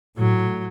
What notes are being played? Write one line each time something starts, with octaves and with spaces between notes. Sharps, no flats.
A2 F#3